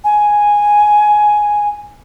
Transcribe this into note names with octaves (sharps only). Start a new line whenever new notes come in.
G#5